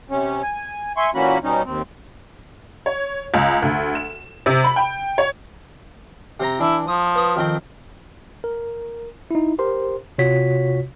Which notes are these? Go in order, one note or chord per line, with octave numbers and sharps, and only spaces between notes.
C3 C#4
G#5
E5 G#5 C6 C#6
A#2 E3 A#3 C#4 F#4 B5
B2 G3 C#4 D#4
D#2 C4
C#5
C#2
D2
E7
C3
B5
G5
C#5
C3 C4 A#5
E3 D4 E4
F3 D#6
B4 D#6
F2 D#3 C4
A#4
D#4 E4
G4 A#4 C5 C6
C3 F4 F#4 C#5 B6